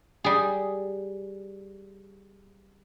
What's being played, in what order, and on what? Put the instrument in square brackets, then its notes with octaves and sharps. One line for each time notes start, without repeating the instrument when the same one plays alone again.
[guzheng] G3 G#4